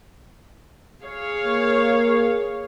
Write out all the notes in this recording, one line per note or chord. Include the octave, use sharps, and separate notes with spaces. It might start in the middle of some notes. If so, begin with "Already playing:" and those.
G#4 C#5 F5
A#3